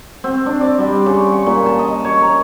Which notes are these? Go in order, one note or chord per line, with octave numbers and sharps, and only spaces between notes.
C4
D4
D5
G3
C#3
C#6
A#2
A5
D#5
C#5
A#4